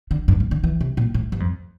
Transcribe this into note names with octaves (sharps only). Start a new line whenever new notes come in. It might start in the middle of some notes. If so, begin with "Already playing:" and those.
D3
G2
A#2
D3
E3
C3
A#2
A2
G2
F2